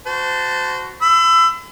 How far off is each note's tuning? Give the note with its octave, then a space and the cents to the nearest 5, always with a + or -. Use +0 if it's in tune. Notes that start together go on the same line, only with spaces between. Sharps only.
F#4 +0 C5 -25 A5 +0
B5 +45 E6 +20